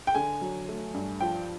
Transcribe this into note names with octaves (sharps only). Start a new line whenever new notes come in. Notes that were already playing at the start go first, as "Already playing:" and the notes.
G5
D3 G#5
F#3
A3
G2
F3 G5